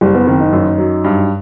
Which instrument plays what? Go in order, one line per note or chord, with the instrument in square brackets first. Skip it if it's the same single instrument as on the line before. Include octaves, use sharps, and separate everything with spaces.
[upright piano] F#1 [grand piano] G3
[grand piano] B3
[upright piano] D#3 [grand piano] C4
[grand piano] D#4
[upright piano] F#2
F#3
G2